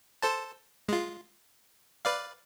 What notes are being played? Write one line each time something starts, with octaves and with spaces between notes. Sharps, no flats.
A4 C5 A5
G#3 F4
B4 D5 F5